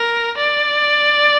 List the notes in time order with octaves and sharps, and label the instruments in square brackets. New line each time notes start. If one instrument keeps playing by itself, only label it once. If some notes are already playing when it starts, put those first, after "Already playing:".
Already playing: [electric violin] A#4
D5